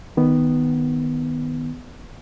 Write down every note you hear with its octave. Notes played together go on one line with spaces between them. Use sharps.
D#3 B3